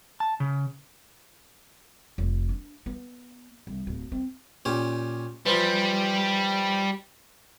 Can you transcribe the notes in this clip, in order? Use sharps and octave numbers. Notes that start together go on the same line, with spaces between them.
A5
C#3
F1
D4
B3
C2
D1
C4
A#2 C#4 G4
E3 F3 G3